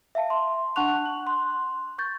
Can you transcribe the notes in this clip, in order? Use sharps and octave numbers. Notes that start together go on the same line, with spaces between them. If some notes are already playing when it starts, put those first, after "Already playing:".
E5 F5 A5
C6
D4 F#5 A5 C#6 F#6 F7
F#7
C6 F#6
C#6 G6 A6